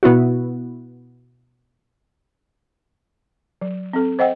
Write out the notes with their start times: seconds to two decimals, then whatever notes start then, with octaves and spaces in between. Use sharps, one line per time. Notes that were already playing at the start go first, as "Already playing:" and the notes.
0.03 B2 B3 E4 F#4
3.62 F#3
3.93 C4 A4
4.19 C5 D#5 F#5 G5